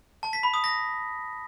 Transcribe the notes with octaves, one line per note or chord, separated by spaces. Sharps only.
A5
B6
B5
D#6
A#6